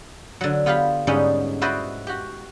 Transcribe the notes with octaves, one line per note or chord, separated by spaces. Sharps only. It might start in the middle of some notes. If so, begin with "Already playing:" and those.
D3 F#3
B3 F4 G4 F5 B5
G#2 D3 G3 B3 C#4 D#4
E4 F#4 B4 C5 D5 D#5
F#4 G4